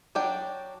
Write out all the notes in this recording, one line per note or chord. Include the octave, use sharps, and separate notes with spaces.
F#3 D4 D5 G5